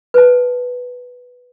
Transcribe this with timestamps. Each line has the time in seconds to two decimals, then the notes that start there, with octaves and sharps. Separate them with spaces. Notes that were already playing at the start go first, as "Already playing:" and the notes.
0.14 B4 A5